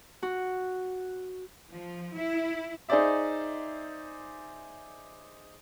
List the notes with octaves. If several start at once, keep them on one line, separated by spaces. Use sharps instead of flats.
F#4
F3
E4
D#4 G#4 C5 D5 E5